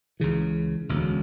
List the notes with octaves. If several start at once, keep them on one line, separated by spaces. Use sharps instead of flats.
C#2 C#3 E3
E1 D2 C#3